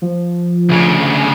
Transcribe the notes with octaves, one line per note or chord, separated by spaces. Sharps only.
F3
D2 C#3